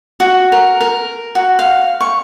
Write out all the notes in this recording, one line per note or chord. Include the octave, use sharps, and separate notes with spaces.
F#4
A#4
A#4
F#4
F5
C#6